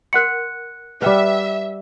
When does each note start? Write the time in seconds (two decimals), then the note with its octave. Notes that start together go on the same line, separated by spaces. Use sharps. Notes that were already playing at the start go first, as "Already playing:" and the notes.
0.13 A#4 F#5 C6 F#6 C#7
1.02 G3 B4 E5 F#5 G5 D6